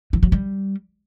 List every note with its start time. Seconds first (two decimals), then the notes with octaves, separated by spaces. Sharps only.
0.13 E3
0.23 F#3
0.32 G3